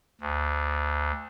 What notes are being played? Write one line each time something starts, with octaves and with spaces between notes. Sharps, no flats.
D2